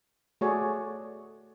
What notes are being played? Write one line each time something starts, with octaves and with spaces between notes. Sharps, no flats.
A3 F#4 G#4 C#5 D5